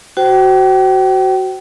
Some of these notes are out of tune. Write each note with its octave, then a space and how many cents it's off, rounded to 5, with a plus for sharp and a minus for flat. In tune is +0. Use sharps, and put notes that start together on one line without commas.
F#4 +15 C5 -10 G5 -35